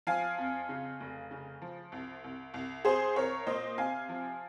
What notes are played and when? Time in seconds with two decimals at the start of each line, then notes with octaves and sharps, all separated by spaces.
0.07 F3 F5 G#5
0.38 F2
0.69 C#3
1.01 F1
1.31 C#3
1.62 F3
1.92 C2
2.24 C2
2.54 C2
2.85 C2 G#4 C5
3.16 C2 A#4 C#5
3.46 A#2 C5 D#5
3.78 C3 F5 G#5
4.09 F3